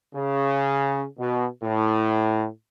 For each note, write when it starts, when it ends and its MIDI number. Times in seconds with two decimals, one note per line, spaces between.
0.15 1.05 49
1.18 1.45 47
1.63 2.46 45